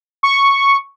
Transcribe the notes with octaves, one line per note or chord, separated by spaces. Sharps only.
C#6